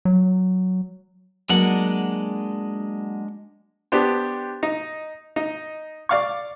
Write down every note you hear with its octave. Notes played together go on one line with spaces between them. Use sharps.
F#3
F#3 G#3 A#3 D4 F#5
B3 D4 G4 C5
D#4
D#4
D5 F5 C#6